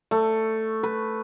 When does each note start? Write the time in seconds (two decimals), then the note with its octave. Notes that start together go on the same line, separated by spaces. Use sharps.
0.11 A3
0.83 B4